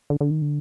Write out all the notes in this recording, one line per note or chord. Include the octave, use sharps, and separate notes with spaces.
D3
D3
D#3
D3